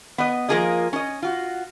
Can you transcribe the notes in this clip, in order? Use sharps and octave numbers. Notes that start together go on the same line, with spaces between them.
B3 D#5
F3 A#3 F4 G#4 A#4 D#5
C#4 D#5
F4 F#4